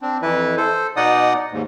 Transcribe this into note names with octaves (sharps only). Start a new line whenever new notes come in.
C4 D4
F2 E3 E4 B4
A4 C5
B2 D#4 D5 D#5 F#5 D#6
D#2 G#2